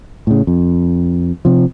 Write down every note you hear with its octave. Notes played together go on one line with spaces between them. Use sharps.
A2 C#3
F2
C3 F3